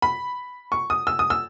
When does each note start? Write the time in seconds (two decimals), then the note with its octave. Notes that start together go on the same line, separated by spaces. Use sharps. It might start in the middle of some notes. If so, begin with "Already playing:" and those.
0.02 B5
0.72 C#6
0.90 D#6
1.07 E6
1.19 D#6
1.30 E6